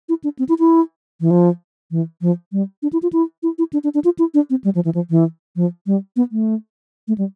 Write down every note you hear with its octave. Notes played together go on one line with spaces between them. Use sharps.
E4
D4
C4
E4
E4
E3
F3
E3
F3
G3
D4
E4
F4
E4
E4
E4
D4
D4
D4
F4
E4
D4
C4
G3
F3
E3
F3
E3
F3
G3
B3
A3
A3
G3